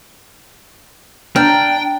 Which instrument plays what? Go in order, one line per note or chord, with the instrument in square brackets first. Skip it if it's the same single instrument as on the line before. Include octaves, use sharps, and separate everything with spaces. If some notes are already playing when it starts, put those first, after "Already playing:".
[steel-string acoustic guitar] D4 [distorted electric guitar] G5 [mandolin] A#5 F6 G6